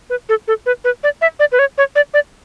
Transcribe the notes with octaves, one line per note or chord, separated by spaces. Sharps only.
B4
A4
A4
B4
B4
D5
E5
D5
B4
C#5
C#5
D5
D5